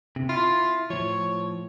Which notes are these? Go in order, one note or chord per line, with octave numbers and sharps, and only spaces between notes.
C3
E4 F4
A2 F3 C#5